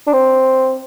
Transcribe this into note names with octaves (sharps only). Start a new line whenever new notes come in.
D4
C4